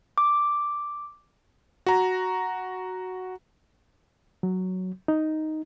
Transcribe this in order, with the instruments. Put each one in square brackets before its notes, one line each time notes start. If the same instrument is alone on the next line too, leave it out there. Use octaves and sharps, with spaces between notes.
[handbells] D6
[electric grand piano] F#4 A#5
[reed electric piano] F#3
D#4